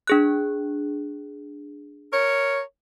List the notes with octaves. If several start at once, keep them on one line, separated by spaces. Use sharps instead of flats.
D4 G#4 F#6
A#4 C#5